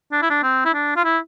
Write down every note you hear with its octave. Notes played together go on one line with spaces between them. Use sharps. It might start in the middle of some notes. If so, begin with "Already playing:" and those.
D4
E4
D4
C4
E4
D4
F4
E4